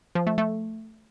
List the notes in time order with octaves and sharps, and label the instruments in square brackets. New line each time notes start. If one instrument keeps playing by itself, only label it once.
[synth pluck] F3
A3
A3